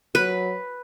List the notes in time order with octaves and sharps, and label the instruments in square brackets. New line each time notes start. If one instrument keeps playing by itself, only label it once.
[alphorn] F#3 [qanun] B4